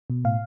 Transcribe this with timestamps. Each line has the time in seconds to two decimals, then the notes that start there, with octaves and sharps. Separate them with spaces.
0.10 B2
0.25 A2 F5